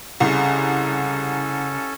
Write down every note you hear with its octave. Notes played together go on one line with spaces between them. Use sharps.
C2 C#3 C#4 G#4 A4